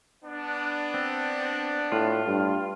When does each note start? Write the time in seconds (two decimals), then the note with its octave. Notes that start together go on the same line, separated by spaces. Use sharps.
0.23 B3 D4
0.94 C4
1.92 A2 F4
2.27 G2